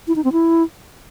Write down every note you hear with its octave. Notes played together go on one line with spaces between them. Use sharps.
E4
D#4
C4
E4